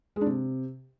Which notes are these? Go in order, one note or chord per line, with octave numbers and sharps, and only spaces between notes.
G#3
D4
C3